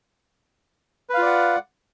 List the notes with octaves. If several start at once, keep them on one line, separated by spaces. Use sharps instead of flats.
F4 B4 D5 F5 F#5